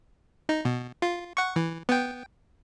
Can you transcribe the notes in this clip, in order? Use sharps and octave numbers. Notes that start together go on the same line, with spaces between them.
D#4
B2
F4
F#5 C#6
E3
B3 G5